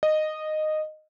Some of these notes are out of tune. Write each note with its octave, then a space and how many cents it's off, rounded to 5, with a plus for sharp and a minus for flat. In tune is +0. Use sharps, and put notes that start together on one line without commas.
D#5 -10